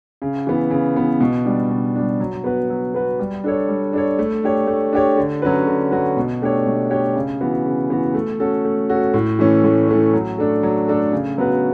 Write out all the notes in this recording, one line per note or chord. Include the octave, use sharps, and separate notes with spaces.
C#3
E3 B3
C#3
E3 B3
B2
G3 D4
B2
G3 D4
F#3
B3 F#4 B4
F#3
B3 F#4 B4
G3
D4 A4 C#5
G3
D4 A4 C#5
A3
D4 G4 C#5
A3
D4 G4 C#5
D3
F#3 C#4 F#4 B4
D3
F#3 C#4 F#4 B4
B2
A3 D4 G4 C#5
B2
A3 D4 G4 C#5
C#3
E3 B3 F#4
C#3
E3 B3 F#4
A3
C#4 F#4 A4
A3
C#4 F#4 A4
A2
E3 A3 C#4
A2
E3 A3 C#4
F#3
A3 D4 A4
F#3
A3 D4 A4
C#3
F#3 B3 F#4 B4